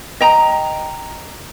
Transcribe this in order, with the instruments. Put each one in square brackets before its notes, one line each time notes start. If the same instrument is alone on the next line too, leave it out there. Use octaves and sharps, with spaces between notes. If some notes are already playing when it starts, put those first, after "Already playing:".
[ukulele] D#5 G5 A#5